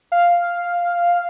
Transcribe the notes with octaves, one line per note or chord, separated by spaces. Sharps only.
F5